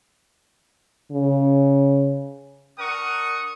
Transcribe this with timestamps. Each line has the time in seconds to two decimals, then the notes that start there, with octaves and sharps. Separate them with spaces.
1.12 C#3
2.79 D4 A#4 F#5 C#6 D#6